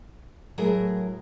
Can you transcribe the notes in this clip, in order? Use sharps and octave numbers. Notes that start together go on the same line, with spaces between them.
A2 F#3 G#4 A#4